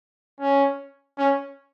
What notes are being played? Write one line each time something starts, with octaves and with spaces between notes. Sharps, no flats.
C#4
C#4